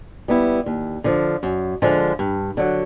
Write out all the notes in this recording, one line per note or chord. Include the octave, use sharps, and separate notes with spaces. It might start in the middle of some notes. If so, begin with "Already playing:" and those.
G3 B3 E4
D#2
D3 F3
F#2
D3 F3 G#3
G2
D3 F#3